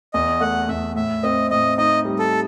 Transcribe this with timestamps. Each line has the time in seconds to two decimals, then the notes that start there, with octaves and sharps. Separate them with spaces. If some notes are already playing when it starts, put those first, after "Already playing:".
0.14 E2 D#5
0.41 A3 F#5
0.69 E2 E5
0.95 A2 E5
1.23 C4 D#5
1.51 A2 D#5
1.78 D#4 D#5
2.05 G3
2.19 A4